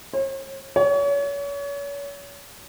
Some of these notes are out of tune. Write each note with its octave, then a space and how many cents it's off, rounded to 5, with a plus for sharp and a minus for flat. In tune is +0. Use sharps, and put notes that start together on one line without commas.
C#5 -45
C#5 +35